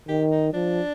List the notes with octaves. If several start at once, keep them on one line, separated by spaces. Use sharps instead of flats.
D#3 G4
D#4
F3 D4